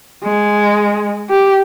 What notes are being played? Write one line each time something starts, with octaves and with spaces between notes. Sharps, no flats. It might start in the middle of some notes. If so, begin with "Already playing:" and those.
G#3
G4